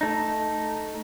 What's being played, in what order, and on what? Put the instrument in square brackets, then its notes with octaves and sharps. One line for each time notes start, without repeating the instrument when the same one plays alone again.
[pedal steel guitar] A3 D#4